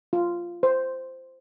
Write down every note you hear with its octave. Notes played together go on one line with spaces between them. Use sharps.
F4
C5